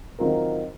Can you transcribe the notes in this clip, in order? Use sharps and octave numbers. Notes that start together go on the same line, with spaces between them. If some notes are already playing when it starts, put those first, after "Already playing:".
D#3 F#3 C4 F4 A#4